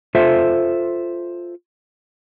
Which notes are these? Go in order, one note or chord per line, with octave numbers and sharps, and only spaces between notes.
F4 A4 C5 E5